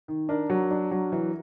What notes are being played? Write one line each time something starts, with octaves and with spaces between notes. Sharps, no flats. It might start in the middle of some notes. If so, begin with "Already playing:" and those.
D#3
D4 A#4
F#3
D4
F#3
E3